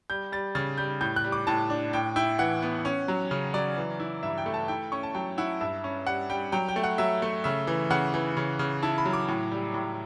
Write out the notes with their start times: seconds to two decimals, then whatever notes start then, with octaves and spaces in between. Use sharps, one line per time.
0.10 G3 G6
0.32 G3 A6
0.55 C#3 A6
0.78 G3 G6
1.01 A2 G6
1.16 F#6
1.24 G3
1.32 D6
1.47 A2 A5
1.70 D4
1.93 A2 G5
2.16 E4 G5
2.39 E3 F#5
2.62 B3
2.85 C#4
3.08 F#3
3.31 C#3
3.54 F#3 D5
3.77 E3
4.00 E4
4.23 G2 E5
4.38 G5
4.46 A3
4.54 A5
4.68 E4 G5
4.92 C#4 C#6
5.03 A5
5.15 F#3 G5
5.38 E4 F#5
5.61 G2 E5
5.84 C#4
6.07 G3 F#5
6.30 G3 G5
6.52 F#3 G5
6.68 G5
6.76 A3
6.84 F#5
6.98 F#3 E5
7.22 A3
7.44 C#3 E5
7.67 E3
7.90 C#3 F#5
8.14 E3
8.37 C#3
8.59 C#3
8.83 E4 A5
8.98 B5
9.05 F#3
9.13 D6
9.28 A2
9.51 G3
9.74 A2